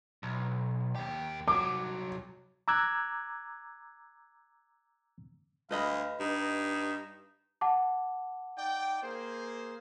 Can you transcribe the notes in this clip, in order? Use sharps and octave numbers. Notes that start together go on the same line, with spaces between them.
B1
D#2 G4
C2 F#3 D6
A#5 D6 E6 F#6 G#6
D2 B4 D#5 F5 B5
G2 D#4
F#5 A5 D6
D#4 D5 G5
A#3 G#4 C5